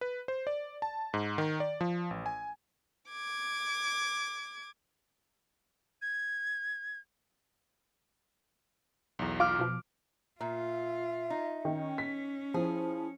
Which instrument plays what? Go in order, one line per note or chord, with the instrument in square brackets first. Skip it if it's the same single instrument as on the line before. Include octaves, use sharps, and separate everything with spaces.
[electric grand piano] B4
C5
D5
A5
G#2
D#3
D5
F3
A1
G#5
[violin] D6 G#6
[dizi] G#6
[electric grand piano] B1 E2
[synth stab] F4 [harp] D6 F6
[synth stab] B2 F3
[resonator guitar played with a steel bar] A#2 [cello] F4 [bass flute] E5
[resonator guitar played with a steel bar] D#4
[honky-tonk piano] D#3 [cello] C#4
[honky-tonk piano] B6
[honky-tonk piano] F3 [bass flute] E4 [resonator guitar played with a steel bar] G#4